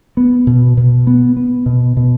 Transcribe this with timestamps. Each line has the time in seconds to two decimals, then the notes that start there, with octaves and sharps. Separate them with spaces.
0.17 B3
0.47 B2
0.77 B2
1.07 B3
1.37 B3
1.66 B2
1.97 B2